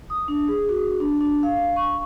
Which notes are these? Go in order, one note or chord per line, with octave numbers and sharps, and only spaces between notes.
D#6
D4
G#4
F#4
D4
D4
F5
C#6